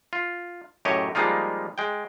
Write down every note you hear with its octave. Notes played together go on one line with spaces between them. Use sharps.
F4
F#2 A2 G4 C#5 D#5
F3 G3 G#3 A#3 D#4 F4
G#3 G5